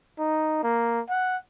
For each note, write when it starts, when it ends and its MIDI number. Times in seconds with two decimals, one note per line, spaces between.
0.19 0.59 63
0.63 1.01 58
1.09 1.37 78